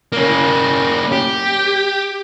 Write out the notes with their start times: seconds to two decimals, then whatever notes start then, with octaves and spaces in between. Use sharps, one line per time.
0.12 A#3 C#4
1.12 G4